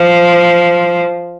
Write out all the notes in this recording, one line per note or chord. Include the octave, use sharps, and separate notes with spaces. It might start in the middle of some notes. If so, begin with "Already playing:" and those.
Already playing: F3